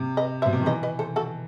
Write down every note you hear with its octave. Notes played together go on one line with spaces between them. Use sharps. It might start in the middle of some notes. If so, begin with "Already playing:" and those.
Already playing: C3
B4 D#5
C5 E5
B2
C3
D#3
E3 B4 D#5
B4 D#5
A4 C5
F#4 A4